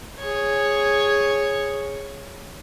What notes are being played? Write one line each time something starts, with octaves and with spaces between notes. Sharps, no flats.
G#4 C#5